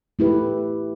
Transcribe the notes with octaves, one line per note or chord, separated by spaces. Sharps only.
A3 E4 G4 B4